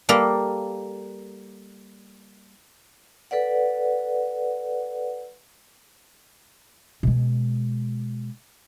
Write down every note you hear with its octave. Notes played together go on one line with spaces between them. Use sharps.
G3 A#3 A4 A#4
A4 B4 D5 F#5
B2 G#3